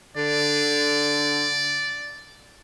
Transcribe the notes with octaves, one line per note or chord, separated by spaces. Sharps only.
D3 D5